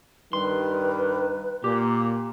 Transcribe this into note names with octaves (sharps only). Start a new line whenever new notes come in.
G2 D#3 G3 B4 C6
A#2 G4